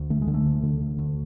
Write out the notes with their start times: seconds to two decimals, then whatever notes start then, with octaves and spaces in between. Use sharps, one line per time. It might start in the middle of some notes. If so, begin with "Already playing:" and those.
Already playing: D2
0.10 D3 A3
0.22 G#3
0.27 D3
0.34 A3
0.46 D2
0.63 D3
0.81 D3
0.99 D2